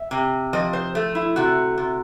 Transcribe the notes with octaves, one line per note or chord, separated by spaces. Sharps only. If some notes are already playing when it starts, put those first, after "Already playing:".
Already playing: E5
C3
F3 D#5
C5
A3
E4
C3 F#4
C3